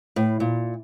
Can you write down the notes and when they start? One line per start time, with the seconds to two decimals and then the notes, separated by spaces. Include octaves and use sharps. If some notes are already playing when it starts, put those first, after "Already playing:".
0.16 A2
0.40 A#2